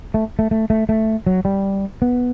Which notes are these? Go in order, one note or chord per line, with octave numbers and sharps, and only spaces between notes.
A3
A3
A3
A3
A3
F#3
G3
B3